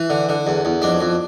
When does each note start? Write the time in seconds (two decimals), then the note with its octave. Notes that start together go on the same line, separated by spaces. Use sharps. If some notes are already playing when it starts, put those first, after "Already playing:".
Already playing: E3
0.10 D3
0.29 D3
0.47 E2
0.65 E2
0.82 F2 D4
1.00 F2